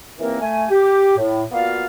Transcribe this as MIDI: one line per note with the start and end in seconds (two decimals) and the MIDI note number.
0.19 0.37 39
0.19 0.37 52
0.19 0.37 58
0.19 0.37 60
0.19 0.37 70
0.41 0.64 57
0.41 0.64 80
0.70 1.13 67
1.17 1.44 45
1.51 1.86 58
1.51 1.86 59
1.51 1.86 65
1.51 1.86 66
1.51 1.86 74
1.51 1.86 77